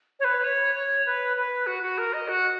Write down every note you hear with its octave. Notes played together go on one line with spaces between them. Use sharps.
C#5
B4
C#5
C#5
B4
B4
F#4
F#4
A#4
D#5
F#4